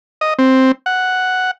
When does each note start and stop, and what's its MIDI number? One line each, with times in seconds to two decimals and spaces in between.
0.21 0.34 75
0.38 0.72 60
0.86 1.51 78